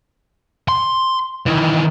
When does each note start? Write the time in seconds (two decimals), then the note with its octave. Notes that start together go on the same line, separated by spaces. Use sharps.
0.68 C6
1.46 D#3 E3